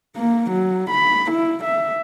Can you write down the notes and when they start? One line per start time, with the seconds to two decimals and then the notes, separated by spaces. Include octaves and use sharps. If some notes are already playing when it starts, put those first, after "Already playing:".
0.16 A#3
0.51 F#3
0.90 B5
1.31 E4
1.64 E5